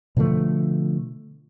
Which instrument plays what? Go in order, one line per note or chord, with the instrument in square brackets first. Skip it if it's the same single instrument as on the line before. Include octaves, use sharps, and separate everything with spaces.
[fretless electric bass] B2 D3 F3 A3